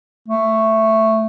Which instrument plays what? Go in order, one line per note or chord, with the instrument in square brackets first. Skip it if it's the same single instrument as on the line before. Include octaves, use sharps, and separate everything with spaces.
[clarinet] A3